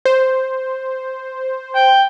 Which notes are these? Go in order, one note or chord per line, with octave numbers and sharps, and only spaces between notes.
C5
G5